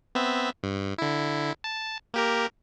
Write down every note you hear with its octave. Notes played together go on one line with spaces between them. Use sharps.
B3 C4 E5
G2
D3 E4
A5
A#3 G4 A#4